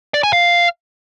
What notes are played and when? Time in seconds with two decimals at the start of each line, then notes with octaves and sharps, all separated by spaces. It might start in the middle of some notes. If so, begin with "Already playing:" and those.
0.14 D5
0.23 G#5
0.33 F5